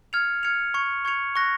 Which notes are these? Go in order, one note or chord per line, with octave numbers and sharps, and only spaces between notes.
F6 G#6 C#7 F7
F6 G#6 C#7 F7
C#6 G#6 C#7 F7
C#6 G#6 C#7 F7
C#6 F#6 A#6